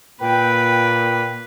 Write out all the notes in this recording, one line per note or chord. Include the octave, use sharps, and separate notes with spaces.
A#2 B4 G5